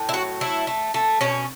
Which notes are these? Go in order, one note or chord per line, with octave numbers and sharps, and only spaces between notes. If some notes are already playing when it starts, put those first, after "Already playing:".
Already playing: A2
E4
F#3 F#4
A3 E4
A3
A3
B2 C#4